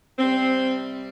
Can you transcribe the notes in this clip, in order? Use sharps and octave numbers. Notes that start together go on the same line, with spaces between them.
C3 G3 C4